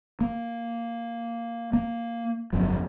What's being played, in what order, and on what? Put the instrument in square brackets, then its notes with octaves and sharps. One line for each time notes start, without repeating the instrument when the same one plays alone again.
[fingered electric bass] A#3
A#3
G1 F2 F#3